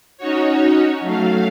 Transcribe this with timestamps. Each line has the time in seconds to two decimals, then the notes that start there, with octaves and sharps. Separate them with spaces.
0.18 C#4 D#4 F#4 C#5
1.01 F#3 A3 F5